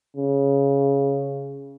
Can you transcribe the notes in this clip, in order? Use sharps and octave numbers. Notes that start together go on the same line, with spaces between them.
C#3